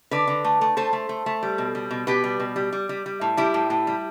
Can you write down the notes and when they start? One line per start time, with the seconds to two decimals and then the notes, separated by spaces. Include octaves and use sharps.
0.11 D3 B4 D5
0.27 D3
0.44 A3
0.61 A3
0.77 A3 A4 C5
0.93 A3
1.09 A3
1.26 A3
1.43 G3
1.58 B2
1.75 G3
1.91 B2
2.07 B2 G4 B4
2.24 G3
2.40 B2
2.56 G3
2.73 G3
2.89 G3
3.06 G3
3.21 A2
3.37 G3 E4 G4
3.54 A2
3.70 A2
3.87 G3